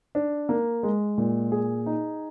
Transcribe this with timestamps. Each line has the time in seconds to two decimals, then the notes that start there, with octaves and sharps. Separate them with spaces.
0.15 D4
0.49 A#3
0.83 G#3
1.18 A#2
1.52 G#4
1.86 D#4